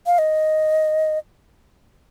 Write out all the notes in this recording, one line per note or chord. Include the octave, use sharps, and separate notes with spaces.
F5
D#5